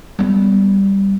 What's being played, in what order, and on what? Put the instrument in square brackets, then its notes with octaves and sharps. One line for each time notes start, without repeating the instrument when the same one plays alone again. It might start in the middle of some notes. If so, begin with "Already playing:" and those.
[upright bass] G3 B3